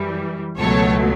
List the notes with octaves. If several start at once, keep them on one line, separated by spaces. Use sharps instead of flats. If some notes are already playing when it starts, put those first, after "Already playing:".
Already playing: F#2 E3 G3
C#2 B2 F#3 A3 A4 C#5